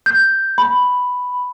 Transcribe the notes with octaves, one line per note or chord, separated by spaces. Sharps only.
G6
B5